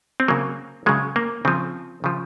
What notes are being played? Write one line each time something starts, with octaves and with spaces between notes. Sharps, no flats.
C4
C#3 F#3 A#3
C#3 F#3 G#3
A#3
C#3 F3 C4
C#3 F3